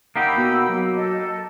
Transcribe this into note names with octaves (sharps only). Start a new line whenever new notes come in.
A#3 D#4 G4 F#5 B5 E6
B2
F#3
A4 D#5